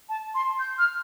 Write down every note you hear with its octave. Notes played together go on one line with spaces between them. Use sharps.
A5
C6
G6
F6